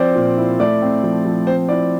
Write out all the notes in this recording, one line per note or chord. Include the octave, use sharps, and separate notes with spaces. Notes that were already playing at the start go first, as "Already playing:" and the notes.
Already playing: F3 C4 C5 D5
A#2
E4
A3 D5
C4
F3
F3
C4 C5
E4 D5